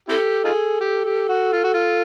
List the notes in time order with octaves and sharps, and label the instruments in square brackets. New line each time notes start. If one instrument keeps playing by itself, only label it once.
[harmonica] C4 E4 G4 [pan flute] A4
[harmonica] D#4 F4 G#4
G4
G4
F#4
F4
F#4
F4